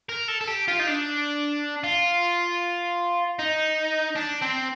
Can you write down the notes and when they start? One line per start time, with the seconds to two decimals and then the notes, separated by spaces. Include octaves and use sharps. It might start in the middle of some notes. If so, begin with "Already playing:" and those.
0.09 A#4
0.28 A4
0.41 A4
0.48 G4
0.68 F4
0.80 D#4
0.87 D4
1.84 F4
3.39 D#4
4.16 D4
4.42 C4